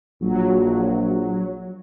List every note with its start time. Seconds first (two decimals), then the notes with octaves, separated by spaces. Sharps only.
0.22 A#1 F#3